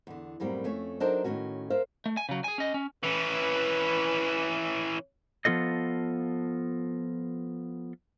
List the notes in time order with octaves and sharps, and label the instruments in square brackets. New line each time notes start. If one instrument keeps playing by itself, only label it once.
[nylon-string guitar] E2 D3
F#2 A2 G3 A#3 C4
F2 A3 C#4 C#5
F#3 D4 D#4 A4 A#4 C5
A2 D#3 F#3 C#4 F#4
A#4 C5 E5 F5
[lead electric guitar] A3
G#5
C#3 F#3
G#4 G#5
C#4 D#5
C#4
[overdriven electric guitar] E3 C#4 [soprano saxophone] B4
[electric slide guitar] F3 B3 F4 A4 D#5